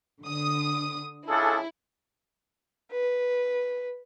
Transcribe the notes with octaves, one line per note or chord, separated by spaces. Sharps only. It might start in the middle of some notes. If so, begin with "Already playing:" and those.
D3 D#6
C#2 E4 G#4 A4
B4